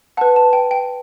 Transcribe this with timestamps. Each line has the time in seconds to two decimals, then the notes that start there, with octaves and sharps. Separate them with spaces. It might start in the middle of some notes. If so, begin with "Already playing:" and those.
0.17 B4 F#5 A5
0.36 A5
0.53 G5
0.71 G5